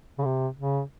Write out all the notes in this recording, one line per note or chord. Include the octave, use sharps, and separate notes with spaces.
C#3
C3
C#3